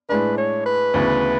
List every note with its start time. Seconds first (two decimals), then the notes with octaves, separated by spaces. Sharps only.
0.09 A2 G#3 D4 B4
0.37 C#5
0.66 B4
0.94 D2 C#3 E3 B3